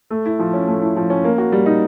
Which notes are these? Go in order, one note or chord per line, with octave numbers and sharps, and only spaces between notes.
A3
E4
F3
C#4
A3
E4
F3
C#4
A#3
F#4
G3
D#4